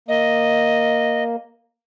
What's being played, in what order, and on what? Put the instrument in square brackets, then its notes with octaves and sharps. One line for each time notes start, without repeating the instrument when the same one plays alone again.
[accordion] A#3 [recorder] D#5